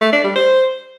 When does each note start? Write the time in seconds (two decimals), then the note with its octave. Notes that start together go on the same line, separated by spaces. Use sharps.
0.01 A3
0.13 D4
0.24 G3
0.35 C5